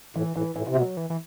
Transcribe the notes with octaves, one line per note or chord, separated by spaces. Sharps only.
A2 E3
A2 E3
A2 E3
C3
B2 F#3
E3
E3